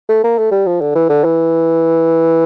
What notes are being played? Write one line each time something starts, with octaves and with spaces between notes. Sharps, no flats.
A3
A#3
A3
G3
F3
D3
E3
D3
E3